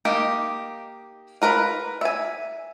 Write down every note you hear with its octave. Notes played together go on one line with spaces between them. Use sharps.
A#3 D#4 G4
F4 A#4 B4 B5
E5 G#5